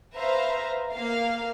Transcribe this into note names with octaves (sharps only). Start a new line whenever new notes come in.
B4 C5 E5 F5 A#5
A#3 F5